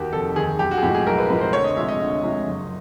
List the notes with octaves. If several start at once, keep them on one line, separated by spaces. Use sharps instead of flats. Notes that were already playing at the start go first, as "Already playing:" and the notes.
Already playing: D#2 D#3 F#4 G4
F1 A4
D#2 D#3 G#4
B1 G4
F#4
G#4
A2 F3 G#3 G4
G#4
B1 A#4
B4
A2 F3 G#3 B4
C5
D2 C#5
D#5
C3 F3 G#3 E5
D#5
D2
C3 F3 G#3
F#1